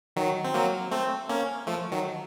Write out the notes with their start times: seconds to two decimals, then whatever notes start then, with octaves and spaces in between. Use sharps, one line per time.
0.16 D#3 F#3
0.44 C4
0.54 F#3 A#3
0.91 A3 C4
1.29 A#3 C#4
1.67 F3 A3
1.92 D#3 F#3